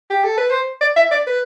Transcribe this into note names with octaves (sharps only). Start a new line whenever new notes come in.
G4
A4
B4
C5
D5
E5
D5
B4